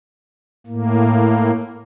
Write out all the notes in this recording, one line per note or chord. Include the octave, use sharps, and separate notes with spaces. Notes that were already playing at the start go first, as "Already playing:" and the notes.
A2 A#3